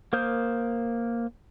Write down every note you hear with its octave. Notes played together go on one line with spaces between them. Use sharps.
A#3 A#4 C5 D#6 G6